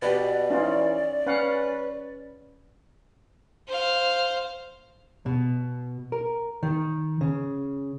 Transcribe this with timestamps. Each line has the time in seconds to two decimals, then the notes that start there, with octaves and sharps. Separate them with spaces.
0.02 B2 G4 B4 D5
0.50 E3 C#4 D#4 F4
1.26 C#4 B4 F5 F#5
3.68 C5 F5
5.26 B2
6.12 A#4
6.63 D#3
7.21 C#3